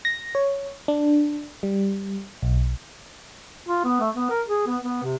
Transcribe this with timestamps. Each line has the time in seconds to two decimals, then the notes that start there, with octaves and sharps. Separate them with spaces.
0.05 A#6
0.35 C#5
0.88 D4
1.63 G3
2.42 B1
3.69 F4
3.85 B3
4.00 A3
4.16 B3
4.30 A#4
4.48 G#4
4.67 B3
4.83 B3
5.03 C3